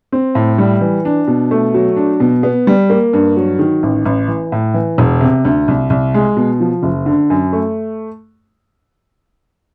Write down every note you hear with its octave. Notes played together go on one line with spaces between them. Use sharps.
C4
A2
G3
E3
D4
B2
A3
F#3
D4
B2
B3
G3
A#3
G2
F#3
D#3
A1
A1
E3
A2
E3
E1
C3
D2
C2
C2
G#3
B2
F3
F#1
D3
F#2
A3